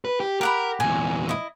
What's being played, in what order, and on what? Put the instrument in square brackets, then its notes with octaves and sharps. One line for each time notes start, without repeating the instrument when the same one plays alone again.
[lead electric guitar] B4
G4
[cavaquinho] G4 F#5 B5 [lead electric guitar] A#4
[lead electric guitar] E2 A#2 [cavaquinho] G#5
[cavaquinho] E4 D#5